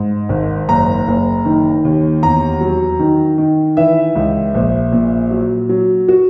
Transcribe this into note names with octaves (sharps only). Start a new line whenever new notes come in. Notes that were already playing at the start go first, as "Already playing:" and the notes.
Already playing: G#2
G#1
F#1 A#5
F#1
D#3
D#2
E2 A#5
F#3
D#3
D#3
E3 E5
C#2
A#1
A#2
F#3
F#3
F#4